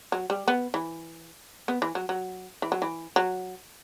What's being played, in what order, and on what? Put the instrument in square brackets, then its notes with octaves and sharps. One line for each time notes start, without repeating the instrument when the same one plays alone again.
[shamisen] F#3
G3
B3
E3
B3
E3
F#3
F#3
E3
F#3
E3
F#3